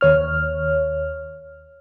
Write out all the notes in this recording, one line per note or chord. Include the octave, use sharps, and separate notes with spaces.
D#2 C#5 F6